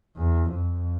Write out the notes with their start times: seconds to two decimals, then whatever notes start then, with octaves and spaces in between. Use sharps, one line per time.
0.17 E2
0.54 F2